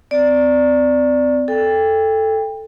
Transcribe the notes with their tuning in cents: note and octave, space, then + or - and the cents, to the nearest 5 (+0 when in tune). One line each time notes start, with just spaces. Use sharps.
C4 -35 D5 +0
A4 +0 G5 +25